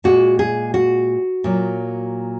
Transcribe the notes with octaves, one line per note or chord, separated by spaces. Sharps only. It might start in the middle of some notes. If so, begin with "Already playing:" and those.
A#2 G#3 F#4
G#4
F#4
A#2 F#3